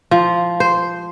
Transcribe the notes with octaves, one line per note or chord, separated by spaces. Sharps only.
F3
C5